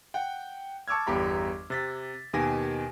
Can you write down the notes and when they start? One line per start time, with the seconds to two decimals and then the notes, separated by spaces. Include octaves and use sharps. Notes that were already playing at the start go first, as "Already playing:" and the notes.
0.14 F#5 G5
0.88 A5 C#6 D6 E6 F6 G#6
1.07 G1 E2 G4 A#5 B5
1.70 C3 A6 B6
2.33 D#2 B2 D#3 G4 G#5 A#6